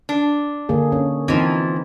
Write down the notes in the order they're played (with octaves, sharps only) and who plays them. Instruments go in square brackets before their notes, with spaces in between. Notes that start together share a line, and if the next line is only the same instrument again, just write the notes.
[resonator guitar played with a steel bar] D4
[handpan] D3 A#3 G#4
C#4
[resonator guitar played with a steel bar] E3 F3 [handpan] C4 D#4